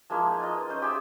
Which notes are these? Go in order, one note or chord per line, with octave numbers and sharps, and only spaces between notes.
F3 G#3 A#3 E4
D#4
F4 D#5
B4
C#4 C5 D#5
G4 G#4 E5